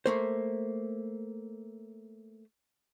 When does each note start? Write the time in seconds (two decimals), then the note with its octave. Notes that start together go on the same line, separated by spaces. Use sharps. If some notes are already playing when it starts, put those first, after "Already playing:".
0.06 A3 A#3 C5